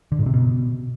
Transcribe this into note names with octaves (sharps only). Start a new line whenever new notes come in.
D3
G#2
C3
B2